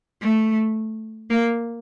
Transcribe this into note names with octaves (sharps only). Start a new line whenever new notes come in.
A3
A#3